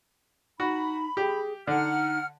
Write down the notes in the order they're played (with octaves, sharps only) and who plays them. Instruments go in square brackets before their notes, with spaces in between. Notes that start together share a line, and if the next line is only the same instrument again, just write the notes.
[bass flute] D#4 [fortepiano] F#4 [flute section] B5
[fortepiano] G4 [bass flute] G#4
[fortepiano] D3 [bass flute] D#4 [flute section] F#5 F6